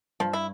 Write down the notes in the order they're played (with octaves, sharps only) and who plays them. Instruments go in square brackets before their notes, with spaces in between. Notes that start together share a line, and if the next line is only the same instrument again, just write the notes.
[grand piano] G2 [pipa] F3
[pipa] E4